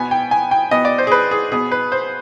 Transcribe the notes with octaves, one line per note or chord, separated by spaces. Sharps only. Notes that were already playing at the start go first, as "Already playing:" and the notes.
Already playing: B2 B3 G#5
G5
G#5
G5
B2 B3 D#5
D5
C5
G#4
B4
G#4
B2 B3 G#4
B4
C5